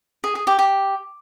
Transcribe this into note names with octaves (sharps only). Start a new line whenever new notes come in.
G#4
G#4
G4
G4